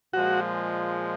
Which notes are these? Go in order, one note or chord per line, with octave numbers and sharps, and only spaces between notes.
A#2 F3 G#3 F#4